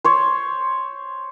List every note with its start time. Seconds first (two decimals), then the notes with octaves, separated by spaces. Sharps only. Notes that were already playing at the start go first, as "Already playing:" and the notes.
0.04 C5 C#5